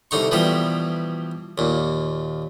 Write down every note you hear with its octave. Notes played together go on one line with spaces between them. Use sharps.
C2 D3 D#4 C#6
B2 E3 F3 G3 G4
D#2 A#2